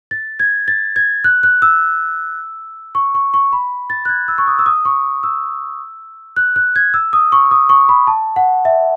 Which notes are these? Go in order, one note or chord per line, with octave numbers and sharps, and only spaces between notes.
A6
G#6
A6
G#6
F#6
F#6
E6
C#6
C#6
C#6
B5
A6
F#6
G#6
E6
C#6
D#6
E6
D#6
C#6
E6
F#6
F#6
G#6
E6
D#6
C#6
D#6
C#6
B5
A5
F#5
E5